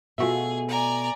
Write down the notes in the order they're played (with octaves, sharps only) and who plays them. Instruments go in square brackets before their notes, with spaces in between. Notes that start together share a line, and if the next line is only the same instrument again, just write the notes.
[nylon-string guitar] B2 A3 [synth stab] F4 F#4 E5 [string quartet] G#4
[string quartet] D5 G#5 A#5